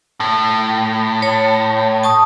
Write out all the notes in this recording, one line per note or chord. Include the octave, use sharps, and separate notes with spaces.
A2
C#5
A5 C#6 D#6